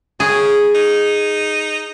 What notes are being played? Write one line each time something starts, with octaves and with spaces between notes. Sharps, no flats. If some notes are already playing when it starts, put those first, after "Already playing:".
C#3 G#4
D#4